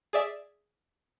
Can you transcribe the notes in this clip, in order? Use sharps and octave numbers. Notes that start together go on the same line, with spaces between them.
G#4 D5 E5